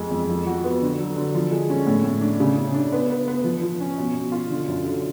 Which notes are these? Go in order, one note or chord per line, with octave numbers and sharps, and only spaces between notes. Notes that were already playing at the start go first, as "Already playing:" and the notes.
Already playing: F2 G#3
F2
F3
F#4
B3
D3
F#3
D3
F3
G#3
C#4
A2
A2
D4
C#3
C#3
D4
B3
B3
B3
F3
F3
C#4
B2
B2
F4
D3
F#2
D3